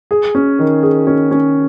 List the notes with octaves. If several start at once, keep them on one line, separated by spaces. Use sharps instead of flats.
G#4
C#4
D#3
G#4
C#4
C#4